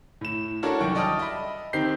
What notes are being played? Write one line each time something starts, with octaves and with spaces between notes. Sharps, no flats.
A2 E7
D4 E4 F#4 A4 A#4 C#5
C2 F#2 D#3 E3 G5 C#6
D5 D#5 G5 A5 D#6 F6
D#5 E5 B5
D#3 C4 D#4 G4 G6 C7